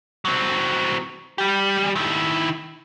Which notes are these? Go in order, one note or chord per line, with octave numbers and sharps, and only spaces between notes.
F#3 C4
G3 G4
D#3 E4